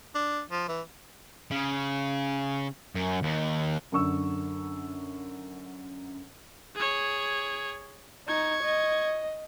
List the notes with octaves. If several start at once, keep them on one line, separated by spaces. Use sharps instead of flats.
D4
F3
E3
C#3
F#2
D#2
F#2 D3 C#6 E6
G#4 C#5
D#4 C#6 G#6
D#5